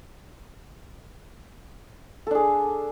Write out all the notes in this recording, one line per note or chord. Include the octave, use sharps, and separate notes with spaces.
D4 G#4 A4